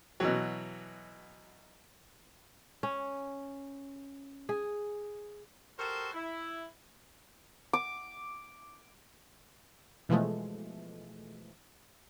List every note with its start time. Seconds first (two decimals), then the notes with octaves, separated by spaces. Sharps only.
0.20 B2 E3 F#3
2.83 C#4
4.49 G#4
5.79 F#4 G4 A4 A#4 C5
6.14 E4
7.73 D6
10.09 B2 E3 F3 G#3 A3